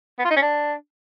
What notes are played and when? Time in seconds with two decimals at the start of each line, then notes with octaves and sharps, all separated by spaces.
0.19 B3
0.25 F4
0.30 D#4
0.36 C#4
0.42 D4